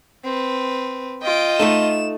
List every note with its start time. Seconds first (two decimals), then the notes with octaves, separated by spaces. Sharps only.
0.24 C4 B4
1.23 F4 D#5 G5 D7
1.59 A3 D#4 A4 E7